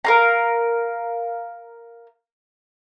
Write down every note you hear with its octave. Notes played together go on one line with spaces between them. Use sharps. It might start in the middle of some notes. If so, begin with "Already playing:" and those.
A#4 F5 A#5